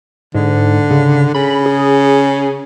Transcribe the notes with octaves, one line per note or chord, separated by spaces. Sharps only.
G#2 D3
C#3
C#3 B5
G#4